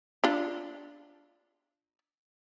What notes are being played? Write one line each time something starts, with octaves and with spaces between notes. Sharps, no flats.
D4 F4